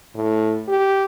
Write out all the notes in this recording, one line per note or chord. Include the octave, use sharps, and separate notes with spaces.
A2
G4